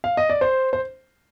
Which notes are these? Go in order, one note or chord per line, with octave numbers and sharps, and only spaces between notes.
F5
D#5
D5
C5
C5